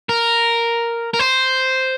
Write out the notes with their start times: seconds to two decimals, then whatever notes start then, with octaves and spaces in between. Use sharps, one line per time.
0.09 A#4
1.14 A#4
1.19 C5